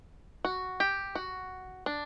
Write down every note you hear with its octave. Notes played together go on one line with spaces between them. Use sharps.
F#4
G4
F#4
D4